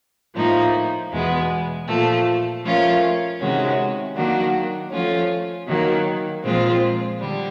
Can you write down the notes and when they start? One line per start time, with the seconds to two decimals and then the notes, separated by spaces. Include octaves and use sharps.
0.35 A2 F3 A#3 D#4
1.11 E2 B2 G#3 B3
1.87 A#2 F3 A3
2.62 F3 A3 C#4 F4 A#4
3.39 C3 D#3 G#3 C#4 F#4
4.15 D#3 F#3 A#3 D4 F#4
4.91 F3 A3 C#4 F4
5.67 D#3 F#3 A#3
6.44 A#2 F3 G#3 C4 F4
7.19 D3 G3